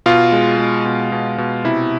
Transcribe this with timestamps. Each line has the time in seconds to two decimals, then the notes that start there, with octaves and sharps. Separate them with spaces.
0.06 B2 F4
0.32 G#3
0.58 G#3
0.85 B2
1.12 B2
1.38 B2
1.65 C3 E4